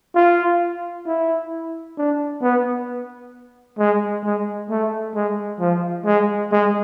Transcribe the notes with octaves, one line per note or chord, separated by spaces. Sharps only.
F4
E4
D4
B3
G#3
G#3
A3
G#3
F3
G#3
G#3